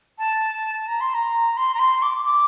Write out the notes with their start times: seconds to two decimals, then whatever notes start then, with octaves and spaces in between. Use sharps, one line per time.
0.19 A5
0.87 A#5
1.00 C6
1.14 A#5
1.57 C6
1.74 A#5
1.79 C6
2.02 D6
2.25 D6